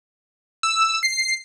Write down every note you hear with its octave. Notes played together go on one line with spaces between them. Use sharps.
E6
C7